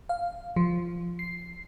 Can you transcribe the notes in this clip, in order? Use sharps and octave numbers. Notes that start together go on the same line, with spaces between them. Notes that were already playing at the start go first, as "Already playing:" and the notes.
F5
F3
C7